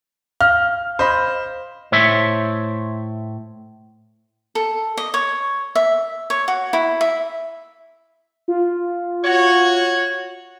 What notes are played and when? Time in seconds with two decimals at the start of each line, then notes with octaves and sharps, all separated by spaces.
0.41 F5 F6
0.99 C5 D#5 B5
1.92 A2 C5 C#5 E5
4.55 A4
4.97 D#5
5.14 C#5
5.75 E5
6.30 C#5
6.48 F#4
6.73 E4
7.01 E5
8.48 F4
9.25 F#4 C#5